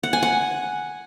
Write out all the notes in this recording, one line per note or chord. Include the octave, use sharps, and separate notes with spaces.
F#5
G#5
F#5